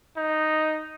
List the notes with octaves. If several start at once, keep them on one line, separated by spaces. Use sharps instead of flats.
D#4